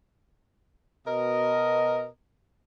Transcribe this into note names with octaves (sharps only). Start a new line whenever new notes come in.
B2 A#4 D#5